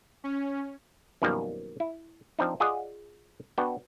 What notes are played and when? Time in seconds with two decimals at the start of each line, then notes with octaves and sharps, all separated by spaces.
0.24 C#4
1.22 F#2 B2 D#3 F3 G3 A#3
1.80 E4
2.39 F3 C4 D4 D#4
2.60 F4 G#4 D5 D#5 F#5
3.58 B3 D4 F#4 G5